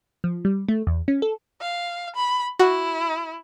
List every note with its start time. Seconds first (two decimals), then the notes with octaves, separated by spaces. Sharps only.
0.24 F3
0.45 G3
0.69 A3
0.87 E2
1.08 C#4
1.22 A4
1.61 F5
2.16 B5
2.59 E4 F#4